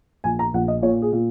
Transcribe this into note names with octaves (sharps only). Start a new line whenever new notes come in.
A#1 G#5
A#5
A#1 F#5
D#5
A#2 C#5
G#4
A#2